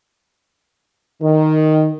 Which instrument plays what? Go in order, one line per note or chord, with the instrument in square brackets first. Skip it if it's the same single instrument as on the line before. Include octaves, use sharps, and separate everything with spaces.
[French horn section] D#3